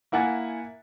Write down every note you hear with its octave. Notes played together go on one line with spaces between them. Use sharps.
A#3 E4 F#5 G#5 A6